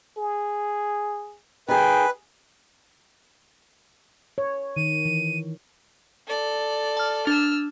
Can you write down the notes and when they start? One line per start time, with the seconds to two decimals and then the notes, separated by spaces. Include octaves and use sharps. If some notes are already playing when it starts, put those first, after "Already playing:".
0.17 G#4
1.68 D#3 G#4 B4 G5
4.38 C#5
4.76 D#3 D#7
5.05 E3
6.27 A4 D5
6.97 A5 F6
7.27 D4 E6 F6